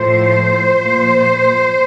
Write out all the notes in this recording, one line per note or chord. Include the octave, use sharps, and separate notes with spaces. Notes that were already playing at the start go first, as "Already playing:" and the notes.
Already playing: A2 F3 A3 C5
A#2 F3 A#3